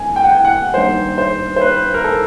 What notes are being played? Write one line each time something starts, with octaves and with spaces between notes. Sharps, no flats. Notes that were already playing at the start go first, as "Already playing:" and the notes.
Already playing: G2 A3 C4 G#5
G5
F#5
G5
F#5
G2 D#3 G3 A#3 C5
C5
C5
B4
A#4
A4